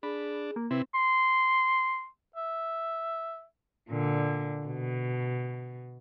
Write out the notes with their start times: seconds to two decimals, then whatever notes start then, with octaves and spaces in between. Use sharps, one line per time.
0.03 D4 G#4 B5
0.56 A#3
0.71 C3 C4 E4 B4
0.95 C6
2.36 E5
3.89 A#2 D3
4.66 B2